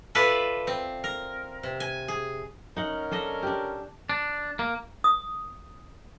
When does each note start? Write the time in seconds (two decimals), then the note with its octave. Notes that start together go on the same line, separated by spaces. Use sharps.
0.15 F4 A4 B4 D5 E5
0.67 C4
1.04 A#4
1.63 C3
1.80 G#5
2.08 G#4
2.76 C#4 D#4 A#4 F#5
3.12 D4 A4 D#5
3.43 D4 G4
4.10 D4
4.59 A#3
5.04 D#6